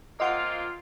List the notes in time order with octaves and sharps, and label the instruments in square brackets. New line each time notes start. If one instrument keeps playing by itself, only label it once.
[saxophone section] A#3 C4 F4 [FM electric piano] D#5 F#5 C6